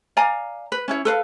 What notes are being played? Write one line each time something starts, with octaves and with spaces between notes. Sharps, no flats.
D5 F5 G#5 A#5
B4
C#4 E4 C#5
A4 B4 F5